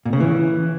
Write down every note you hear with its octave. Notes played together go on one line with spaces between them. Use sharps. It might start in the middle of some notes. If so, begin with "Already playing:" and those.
A#2
C#3
E3